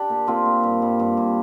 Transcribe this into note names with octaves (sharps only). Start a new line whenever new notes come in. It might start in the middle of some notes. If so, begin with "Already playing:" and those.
Already playing: D4 G4
A#2
A#2 C4 F4
A#2
G2
G2
G2
G2